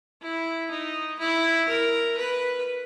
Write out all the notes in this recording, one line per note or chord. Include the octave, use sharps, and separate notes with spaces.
E4
D#4
E4
A#4
B4